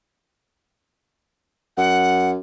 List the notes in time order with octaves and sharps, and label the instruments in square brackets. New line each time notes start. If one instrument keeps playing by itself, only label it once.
[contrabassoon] F#2 [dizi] F#5